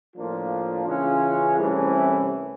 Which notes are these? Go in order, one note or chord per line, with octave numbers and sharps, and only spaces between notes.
A2 F3 A#3 D4 F4
C#3 E3 G#3 C#4 F4
C2 C3 E3 A3 C#4